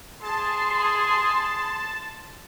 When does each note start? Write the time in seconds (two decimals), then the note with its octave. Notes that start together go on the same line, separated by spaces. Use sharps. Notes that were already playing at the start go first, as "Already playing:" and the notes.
0.23 G#4 A5 C6